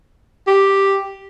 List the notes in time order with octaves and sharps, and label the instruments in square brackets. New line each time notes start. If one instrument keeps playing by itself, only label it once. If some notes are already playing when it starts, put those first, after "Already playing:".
[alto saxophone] G4